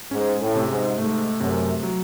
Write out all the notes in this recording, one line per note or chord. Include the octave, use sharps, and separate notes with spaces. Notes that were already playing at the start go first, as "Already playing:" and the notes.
G#2 C#4
A2
C3
G#2
G#2 A3
F#2 C3
F#3